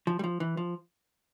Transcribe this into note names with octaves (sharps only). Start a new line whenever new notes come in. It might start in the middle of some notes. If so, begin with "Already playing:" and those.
F3
G3
F3
E3
F3